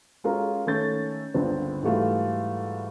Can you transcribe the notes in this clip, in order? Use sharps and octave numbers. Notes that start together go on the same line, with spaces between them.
G#3 C#4 F4 F#4 A4 A#4
D#3 A3 C#4 A4 G6 A6
G1 C#2 D3 C4
G#2 E3 G3 A3 F4 F#4